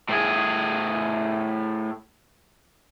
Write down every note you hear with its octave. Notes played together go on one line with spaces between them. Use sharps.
A2 G#4